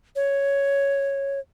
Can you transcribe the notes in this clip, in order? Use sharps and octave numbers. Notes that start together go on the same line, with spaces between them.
C#5